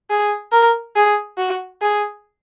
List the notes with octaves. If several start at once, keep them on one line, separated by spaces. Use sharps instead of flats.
G#4
A#4
G#4
F#4
G#4